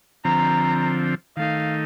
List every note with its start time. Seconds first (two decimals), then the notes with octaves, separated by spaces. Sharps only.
0.24 D3 F3 C4 A#5
1.37 D#3 A3 D#4 F5